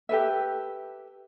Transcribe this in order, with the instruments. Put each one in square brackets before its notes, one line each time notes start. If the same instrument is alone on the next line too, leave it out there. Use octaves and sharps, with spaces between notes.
[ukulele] G4 A4 B4 E5